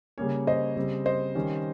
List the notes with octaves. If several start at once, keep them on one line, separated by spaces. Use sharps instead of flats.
C#3 G3 A#3 C#4 C#5
C5 D#5
C#3 G3 C4
C5 D#5
D#3 G3 C#4